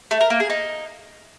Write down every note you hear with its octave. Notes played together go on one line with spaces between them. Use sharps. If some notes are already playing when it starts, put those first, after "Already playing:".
A3
A#4
A#3
G#4
D#4